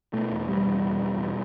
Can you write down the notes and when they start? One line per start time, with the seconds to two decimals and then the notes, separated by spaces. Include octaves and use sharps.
0.13 B2 A3
0.32 E2
0.49 B2 G3
0.66 E2
0.84 B2
1.01 E2
1.18 B2